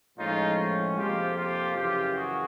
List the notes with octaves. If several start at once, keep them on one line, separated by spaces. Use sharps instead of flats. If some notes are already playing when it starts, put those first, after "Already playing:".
A2 F3 G#3 C#4 D#4 F4
F2 C3 F3 A#3 F4 G4
F4 G4
F#2 C#3 E3 F4 G4
F#4 G#4